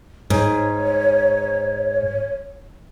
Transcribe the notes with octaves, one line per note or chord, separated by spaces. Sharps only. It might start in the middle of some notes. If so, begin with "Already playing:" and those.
G#2 C#5